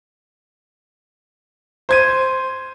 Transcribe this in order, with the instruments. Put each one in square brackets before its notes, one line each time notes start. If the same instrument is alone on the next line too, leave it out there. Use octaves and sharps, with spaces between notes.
[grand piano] C5 G#6 D#7